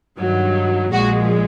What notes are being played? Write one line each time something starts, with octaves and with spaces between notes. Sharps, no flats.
G2 D#3 F#3
A#1 A#2 F3 G#3 F#4